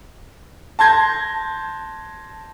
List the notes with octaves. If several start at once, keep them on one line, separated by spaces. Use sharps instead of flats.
A5 C6 G6 G#6 A#6